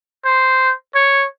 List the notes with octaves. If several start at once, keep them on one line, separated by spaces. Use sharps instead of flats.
C5
C#5